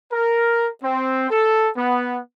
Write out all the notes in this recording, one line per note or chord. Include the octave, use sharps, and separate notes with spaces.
A#4
C4
A4
B3